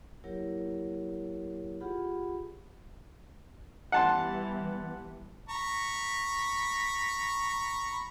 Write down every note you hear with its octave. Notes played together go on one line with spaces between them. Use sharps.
F#3 A#3 E4 G4 A#4 C#5
F4 G4 G#4 F#5 B5
E3 G3 B3 F#5 A5 C6
A#5 B5 C#6